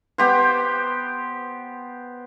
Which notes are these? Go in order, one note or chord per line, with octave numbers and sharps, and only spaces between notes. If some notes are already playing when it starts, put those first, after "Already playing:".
B3 G4 C5